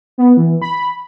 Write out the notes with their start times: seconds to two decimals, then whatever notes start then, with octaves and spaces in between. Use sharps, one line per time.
0.18 B3
0.37 E3
0.62 B5